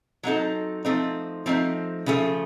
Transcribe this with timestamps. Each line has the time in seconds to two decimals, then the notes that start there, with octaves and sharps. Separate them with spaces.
0.23 F#3 C4 D#4 A4
0.85 F3 A3 C4 D#4
1.46 F3 A3 C4 D#4
2.06 C#3 F3 A3